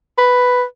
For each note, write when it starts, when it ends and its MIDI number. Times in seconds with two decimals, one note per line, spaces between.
0.18 0.63 71